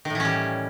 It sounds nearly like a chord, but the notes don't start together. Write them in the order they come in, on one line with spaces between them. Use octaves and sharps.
D#3 A2 E3 C#4 G3